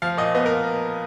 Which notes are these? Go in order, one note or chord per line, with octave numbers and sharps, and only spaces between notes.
F3 F5
A#2 D#5
B3 D#5
A#4